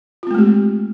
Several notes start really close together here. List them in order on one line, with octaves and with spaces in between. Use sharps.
F4 C4 A3 G#3 G4